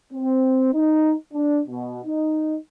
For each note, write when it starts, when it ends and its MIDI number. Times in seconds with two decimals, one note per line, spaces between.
0.13 0.73 60
0.73 1.13 63
1.34 1.60 62
1.68 2.01 47
2.05 2.56 63